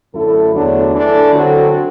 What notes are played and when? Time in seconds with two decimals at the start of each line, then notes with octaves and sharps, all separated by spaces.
0.14 F#2 D3 A3 E4 A4
0.54 E2 D3 F#3 A3 D4
0.93 E3 A3 D4 A4
1.33 D3 F#3 C4 F#4 A4